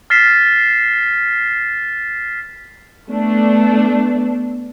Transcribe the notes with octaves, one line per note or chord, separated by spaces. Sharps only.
F6 A6 B6 C7 E7
A3 B3 D4